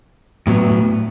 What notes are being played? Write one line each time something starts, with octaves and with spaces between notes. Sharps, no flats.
A2 F#3 B3